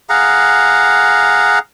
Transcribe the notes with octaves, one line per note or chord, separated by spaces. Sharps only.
G#4 F5 F#5 A#5